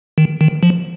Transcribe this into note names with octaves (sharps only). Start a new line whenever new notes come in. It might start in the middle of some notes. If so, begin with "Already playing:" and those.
D#3
D#3
F3